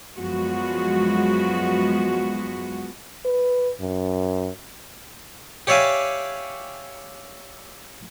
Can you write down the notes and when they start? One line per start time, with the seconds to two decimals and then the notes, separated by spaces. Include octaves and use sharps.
0.18 F#2 F3 G#3 B3 F#4
3.25 B4
3.81 F#2
5.67 G4 C#5 D5 E5 F5 G#5